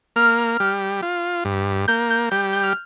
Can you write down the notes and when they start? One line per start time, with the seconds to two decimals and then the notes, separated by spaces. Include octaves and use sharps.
0.16 A#3 F6
0.60 G3
1.02 F4
1.45 G2
1.88 A#3 G6
2.10 G6
2.31 G3 G6
2.53 G6
2.63 F6